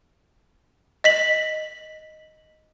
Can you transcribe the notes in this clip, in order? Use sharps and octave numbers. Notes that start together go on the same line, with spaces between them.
D#5 B6 F#7